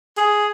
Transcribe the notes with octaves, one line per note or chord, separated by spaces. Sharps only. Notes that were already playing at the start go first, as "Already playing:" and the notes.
G#4